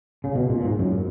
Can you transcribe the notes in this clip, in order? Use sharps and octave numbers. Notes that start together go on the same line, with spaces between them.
C#3
B2
A#2
G#2
F#2